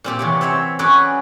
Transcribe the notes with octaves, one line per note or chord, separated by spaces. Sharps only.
A#2 C4 G4
C3 E3 F#3
C4 C5 C#5 E5
F#3 C#4 F#4 G#4 B4 D5